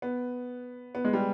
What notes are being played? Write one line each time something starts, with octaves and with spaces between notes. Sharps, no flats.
B3
B3
G#3
G3